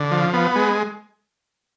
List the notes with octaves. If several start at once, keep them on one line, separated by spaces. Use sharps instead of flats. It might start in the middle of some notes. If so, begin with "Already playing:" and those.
Already playing: D3
F3
B3
G#3